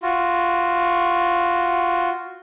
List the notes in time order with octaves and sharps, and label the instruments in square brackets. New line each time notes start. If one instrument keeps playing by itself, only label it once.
[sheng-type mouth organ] F4 F#4